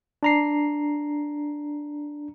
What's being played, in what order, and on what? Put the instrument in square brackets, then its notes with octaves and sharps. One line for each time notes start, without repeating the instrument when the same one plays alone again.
[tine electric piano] D4 A#5 C7